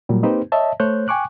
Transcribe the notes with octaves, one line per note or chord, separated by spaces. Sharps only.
A#2 F#3 G3
A#3 C4 D#4 G4 B4 C5
C#5 D#5 E5 A5
A3 C5 C#5 F#6 G6
G5 G#5 C#6 D6 F#6